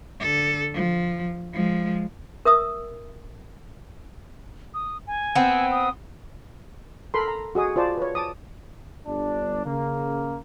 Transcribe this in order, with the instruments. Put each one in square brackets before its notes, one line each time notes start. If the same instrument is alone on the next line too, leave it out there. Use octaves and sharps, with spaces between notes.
[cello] D3 A4
F3
F3 G#3
[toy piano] A#4 E5 D#6 E6
[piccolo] D#6
G#5
[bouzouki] B3 C4
[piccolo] D#6
[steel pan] A4 A#4 B5 C6
A#5
F#4 G#4 D#5 D#6
F4 C5 D5 A5
B4 C#5
A5 D6 D#6
[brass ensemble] G1 D4
C#3 A#3